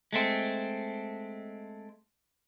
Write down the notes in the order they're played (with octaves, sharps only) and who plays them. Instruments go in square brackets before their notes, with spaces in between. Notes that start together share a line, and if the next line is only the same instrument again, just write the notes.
[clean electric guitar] G#3 A3 C4